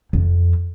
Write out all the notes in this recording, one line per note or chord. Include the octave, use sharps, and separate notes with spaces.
F2